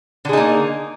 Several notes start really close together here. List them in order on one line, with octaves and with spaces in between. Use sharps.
D3 G#4 D#4 A#3